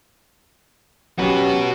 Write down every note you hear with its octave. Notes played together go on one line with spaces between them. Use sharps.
F#3 C#4 F#4 G4 B4